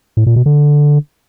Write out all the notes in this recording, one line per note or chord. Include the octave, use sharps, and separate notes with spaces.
A2
A#2
B2
D3